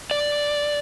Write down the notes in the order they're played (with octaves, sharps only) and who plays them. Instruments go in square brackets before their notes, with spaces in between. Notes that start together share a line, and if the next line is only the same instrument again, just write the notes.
[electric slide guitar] D5